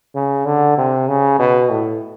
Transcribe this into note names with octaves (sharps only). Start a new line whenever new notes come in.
C#3
D3
C3
C#3
B2
A2